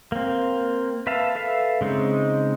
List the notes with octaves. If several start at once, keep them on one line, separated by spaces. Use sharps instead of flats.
A#3 C4
B4 E5 F5 A5
A4 B4 E5 F5
C#3 G#3 C4 D#4